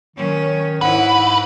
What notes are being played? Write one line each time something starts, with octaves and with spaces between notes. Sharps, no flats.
D#3 F#3 C#4
G#2 E4 B4 F#5